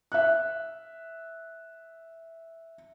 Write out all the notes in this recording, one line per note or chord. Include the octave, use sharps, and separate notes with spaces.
E5 F#6